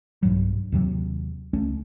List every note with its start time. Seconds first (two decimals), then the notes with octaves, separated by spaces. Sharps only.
0.23 B1 G2 F#3
0.72 D#2 C3 F#3
1.53 C#2 A3 C#4